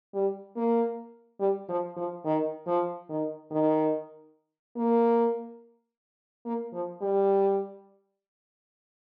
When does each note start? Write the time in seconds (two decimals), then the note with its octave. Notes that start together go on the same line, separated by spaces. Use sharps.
0.14 G3
0.57 A#3
1.40 G3
1.69 F3
1.97 F3
2.25 D#3
2.67 F3
3.09 D#3
3.51 D#3
4.77 A#3
6.46 A#3
6.74 F3
7.02 G3